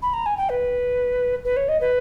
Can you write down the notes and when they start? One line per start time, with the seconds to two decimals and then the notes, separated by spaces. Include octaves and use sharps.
0.02 B5
0.13 A#5
0.26 G#5
0.37 G5
0.49 B4
1.44 B4
1.56 C#5
1.68 D#5
1.81 B4